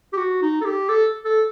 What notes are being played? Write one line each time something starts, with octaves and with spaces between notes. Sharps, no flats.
G4
F#4
D#4
A4
G4
A4
A4